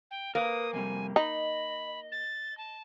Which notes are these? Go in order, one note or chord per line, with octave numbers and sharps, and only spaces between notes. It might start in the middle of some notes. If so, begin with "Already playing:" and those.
G5
A#3 A#4 B4 D#6
F2 C3 G3 G#5
D#4 D#5 B5
A6
A5